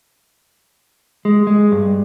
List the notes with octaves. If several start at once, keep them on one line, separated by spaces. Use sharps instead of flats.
G#3
G#3
G2